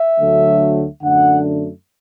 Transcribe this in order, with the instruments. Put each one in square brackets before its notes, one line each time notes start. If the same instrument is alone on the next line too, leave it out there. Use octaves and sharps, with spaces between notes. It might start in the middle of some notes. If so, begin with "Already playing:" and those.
Already playing: [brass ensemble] E5
D2 D3 F#3 A3
F#2 D3 A3 D4 F#5